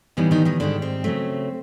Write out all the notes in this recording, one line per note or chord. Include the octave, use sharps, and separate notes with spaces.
A2 D#3 E3 G3 B3 D#4
D#3 D#4
D#3 D#4
G#2 D3 D#3 G3 D4
C4
C#3 F#3 A3